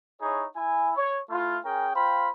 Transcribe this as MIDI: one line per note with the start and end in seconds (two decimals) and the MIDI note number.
0.22 0.45 63
0.22 0.45 64
0.22 0.45 68
0.22 0.45 73
0.56 0.92 64
0.56 0.92 80
0.97 1.19 73
1.30 1.57 57
1.30 1.57 64
1.30 1.57 65
1.65 1.91 61
1.65 1.91 68
1.65 1.91 70
1.65 1.91 79
1.95 2.29 65
1.95 2.29 72
1.95 2.29 77
1.95 2.29 79
1.95 2.29 83